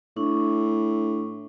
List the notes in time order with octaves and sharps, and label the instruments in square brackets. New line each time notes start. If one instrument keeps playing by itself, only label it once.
[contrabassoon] A2 [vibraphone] D4 E4 C#6